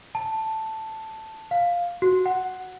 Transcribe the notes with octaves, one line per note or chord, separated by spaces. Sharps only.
A5
F5
F#4
F#5